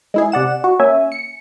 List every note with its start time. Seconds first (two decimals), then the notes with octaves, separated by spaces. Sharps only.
0.14 G#3 E4 G#4
0.32 C3 D5 F#5 E7
0.64 F#4
0.80 A#3 C#4 E5 G#5
1.12 C#7